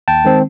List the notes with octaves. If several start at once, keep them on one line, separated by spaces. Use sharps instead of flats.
D#2 G5 A5
D#3 G#3 C4